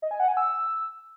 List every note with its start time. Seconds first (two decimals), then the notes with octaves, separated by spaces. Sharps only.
0.02 D#5
0.11 G#5
0.20 F#5
0.28 G#5
0.37 E6